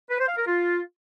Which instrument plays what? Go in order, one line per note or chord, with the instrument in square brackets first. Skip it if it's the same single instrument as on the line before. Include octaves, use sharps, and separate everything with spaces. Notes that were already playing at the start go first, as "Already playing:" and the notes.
[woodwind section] B4
C5
F5
A#4
F4